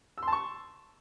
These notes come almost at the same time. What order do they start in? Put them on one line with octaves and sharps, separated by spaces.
E6 C6 A5 C#6